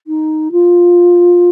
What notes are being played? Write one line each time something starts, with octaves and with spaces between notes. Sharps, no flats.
D#4
F4